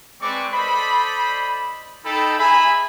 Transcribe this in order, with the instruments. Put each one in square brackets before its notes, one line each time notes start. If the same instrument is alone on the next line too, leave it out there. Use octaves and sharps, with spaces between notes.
[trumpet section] G#3 C4 B4 D5 C#6 D6
A4 C5 D5 D#5 B5
D#4 A4 G5 A5 B5
G#4 E5 G#5 A#5 B5